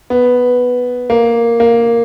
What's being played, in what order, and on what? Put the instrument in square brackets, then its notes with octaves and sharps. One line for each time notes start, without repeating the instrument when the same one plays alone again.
[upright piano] B3
A#3
A#3